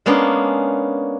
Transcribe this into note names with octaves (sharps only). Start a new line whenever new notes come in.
G#3 A#3 B3 C#4 D4